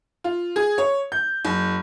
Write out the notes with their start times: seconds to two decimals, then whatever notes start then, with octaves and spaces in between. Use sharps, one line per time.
0.24 F4
0.56 G#4
0.78 C#5
1.12 G6
1.45 F#1